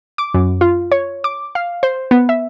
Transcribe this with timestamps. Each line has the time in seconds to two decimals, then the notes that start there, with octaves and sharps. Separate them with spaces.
0.18 D6
0.34 F#2
0.61 F4
0.92 C#5
1.24 D6
1.55 F5
1.83 C5
2.11 B3
2.29 E5